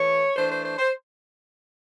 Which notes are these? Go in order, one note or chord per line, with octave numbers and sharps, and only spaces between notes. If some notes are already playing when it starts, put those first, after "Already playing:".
Already playing: E3 A3 C#5
E3 A3 D4 C5
C5
C5
C5